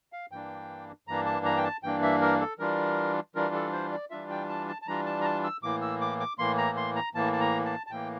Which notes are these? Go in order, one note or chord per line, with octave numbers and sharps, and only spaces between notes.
F5
G2 E3 A#3 D4 G5
G2 E3 A#3 D4 A#5
A5
A#5
G5
A5
G2 E3 A#3 D4 G5
E5
A#4
A4
E3 G3 D4 F4 A#4
E3 G3 D4 F4 A#4
A4
C5
D5
E3 G3 D4 F4 E5
G5
A5
A5
A5
E3 G3 D4 F4 A#5
A5
A#5
A5
E6
A2 E3 A#3 D6
E6
D6
D6
A2 E3 A#3 C6
A#5
C6
A#5
A2 E3 A#3 A5
A5
A#5
A5
A5
A2 E3 A#3 G5